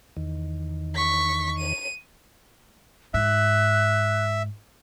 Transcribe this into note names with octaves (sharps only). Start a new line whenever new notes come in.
E2 D#3
C#6 B6
D#7
G#2 E5 F#6